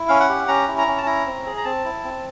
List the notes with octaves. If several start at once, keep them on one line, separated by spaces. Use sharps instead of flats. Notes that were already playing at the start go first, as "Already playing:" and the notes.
Already playing: E4
C#4 F5
F#5
G4
C#4 A#5
E4
A#5
C#4
A5
E4 A#5
C4
G#4
A#5
C4 A5
E4
C4